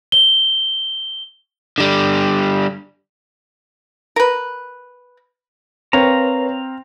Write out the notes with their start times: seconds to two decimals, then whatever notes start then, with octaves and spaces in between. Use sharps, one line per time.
0.12 G7
1.78 D3 G3
4.16 A#4 B4
5.93 C4 A#4 B4 C#5 F5 A#5